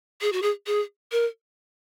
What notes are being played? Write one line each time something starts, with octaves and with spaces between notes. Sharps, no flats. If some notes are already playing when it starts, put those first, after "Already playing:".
G#4
F#4
G#4
G#4
A#4